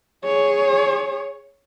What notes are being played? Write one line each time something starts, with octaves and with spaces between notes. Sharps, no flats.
G#4 C#5